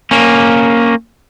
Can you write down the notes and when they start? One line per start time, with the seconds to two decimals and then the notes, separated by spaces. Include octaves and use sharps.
0.11 A#3 C#4